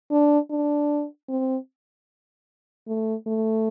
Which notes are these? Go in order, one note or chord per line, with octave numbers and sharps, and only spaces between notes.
D4
D4
C4
A3
A3